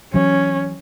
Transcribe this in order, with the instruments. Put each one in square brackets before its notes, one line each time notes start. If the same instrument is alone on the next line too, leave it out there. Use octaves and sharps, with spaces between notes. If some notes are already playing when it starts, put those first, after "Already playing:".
[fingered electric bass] E3 F#3 [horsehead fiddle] C#4